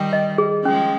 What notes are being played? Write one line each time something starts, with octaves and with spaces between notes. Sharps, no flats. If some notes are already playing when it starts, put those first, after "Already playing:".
Already playing: D#3 G3 G5
D#5
G#4
F3 G#3 C#4